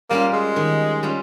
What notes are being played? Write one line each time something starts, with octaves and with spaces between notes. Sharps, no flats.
G3 A#3 C#4 F4
G#3
D#3
G3 C#4 F4